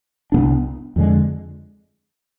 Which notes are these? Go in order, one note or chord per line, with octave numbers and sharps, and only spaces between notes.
C2 B2 B3 D4
F2 D3 G#3